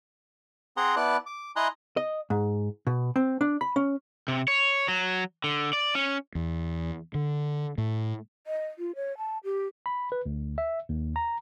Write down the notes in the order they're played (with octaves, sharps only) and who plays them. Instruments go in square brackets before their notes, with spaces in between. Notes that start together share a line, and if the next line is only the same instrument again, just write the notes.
[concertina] C4 G#4 F#5 A#5 C6
B3 E4 D5 A5 F#6
D6
E4 D#5 G#5 A#5 C6 F#6
[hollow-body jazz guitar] D#5
G#2
B2
C4
D4
B5
C#4
[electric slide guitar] C3
C#5
F#3
D3
D5
C#4
[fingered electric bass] E2
D3
A2
[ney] D#5
F4
C#5
A5
G4
[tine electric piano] B5
B4
D2
E5
D#2
A#5